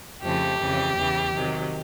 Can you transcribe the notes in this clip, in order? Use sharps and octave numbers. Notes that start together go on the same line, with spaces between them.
F2 C#3 F3 A3 G4
F2 C#3 E3
E2 C#3 E3
C3 D#3 F#3